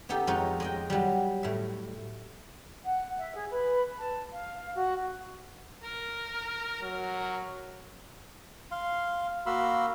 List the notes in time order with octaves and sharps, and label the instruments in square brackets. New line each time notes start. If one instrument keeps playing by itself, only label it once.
[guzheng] B3 D#4 G4 A4
F2 G#3 D#4 F4 C#5 D#5
G#3 D#5 G5
F#3 G3
A2 E5
[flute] F#5
E5
G#4
B4
A5
F5
F5
F#4
[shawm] A#4
[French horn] F#3 [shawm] A#4
[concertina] F5 C6
A#3 F#4 F5 B5 C6 E6